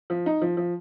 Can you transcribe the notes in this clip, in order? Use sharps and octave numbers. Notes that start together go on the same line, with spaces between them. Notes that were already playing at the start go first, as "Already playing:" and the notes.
F3
D#4
F3
F3